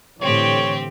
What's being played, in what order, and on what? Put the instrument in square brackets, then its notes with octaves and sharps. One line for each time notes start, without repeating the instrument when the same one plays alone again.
[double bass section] A2 D3 E3 [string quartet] C4 G4 [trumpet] C#5